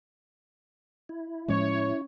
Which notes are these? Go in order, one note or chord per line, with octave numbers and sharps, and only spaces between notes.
E4
A2 F3 G#3 C#4 C#5